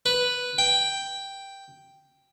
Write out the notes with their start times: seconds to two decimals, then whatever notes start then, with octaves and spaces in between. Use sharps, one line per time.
0.06 B4
0.58 G5